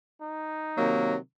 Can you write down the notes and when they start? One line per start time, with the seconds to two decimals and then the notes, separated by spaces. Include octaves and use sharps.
0.21 D#4
0.76 C3 D#3 F#3 A#3